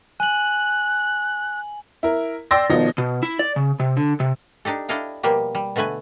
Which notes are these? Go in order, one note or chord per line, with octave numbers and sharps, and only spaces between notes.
G#5 F#6 F#7
E4 A#4
D5 G5 C6 E6 A6 A#6
G#1 B2 F3 D#4 A#6
B2
E4
D5
C#3
C3
D3
C3
D4 D#4 G4 A4
D4 E4 A4 D#5 F5 G5
B2 F3 G3 A#3 G4
G3
B2 D3 A3 B4 G#5